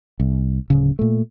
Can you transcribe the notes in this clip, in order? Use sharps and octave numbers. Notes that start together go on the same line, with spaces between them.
C2
D1 C#3
A#2 A3